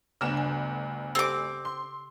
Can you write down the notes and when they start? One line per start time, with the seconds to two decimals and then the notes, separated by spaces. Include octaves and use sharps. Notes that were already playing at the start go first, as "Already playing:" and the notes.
0.21 G1 D2 C#3 D4 E7
0.37 G#5
1.15 C4 G4 A4 C5 D6
1.65 C6